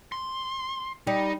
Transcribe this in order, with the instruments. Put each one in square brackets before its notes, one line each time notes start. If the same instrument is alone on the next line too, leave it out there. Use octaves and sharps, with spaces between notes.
[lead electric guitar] C6
[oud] G3 [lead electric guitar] D#4